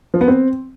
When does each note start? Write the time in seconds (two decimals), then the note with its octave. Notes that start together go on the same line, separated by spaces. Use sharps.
0.14 F3
0.21 B3
0.28 C4